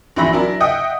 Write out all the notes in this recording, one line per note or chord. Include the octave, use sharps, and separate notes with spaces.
A#1 E3 F#4 E5 B5 A#6
F#3 D4 E4 A#4 E5
D#5 E5 F#5 G5 D#6